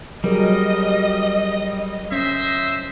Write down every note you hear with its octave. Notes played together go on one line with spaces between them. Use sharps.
F#3 G3 G#4 A#4 D#5
C#4 C5 D#5 E5